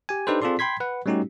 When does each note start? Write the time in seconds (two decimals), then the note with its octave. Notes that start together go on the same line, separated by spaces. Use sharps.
0.09 G4 G#5
0.27 D4 D#4 G4 A4 B4 C5
0.42 C4 F4 G#4 A4 D5 C6
0.59 G5 B5 C6 G#6 B6
0.80 B4 F#5
1.06 G3 A3 C#4 D#4 F#4 G4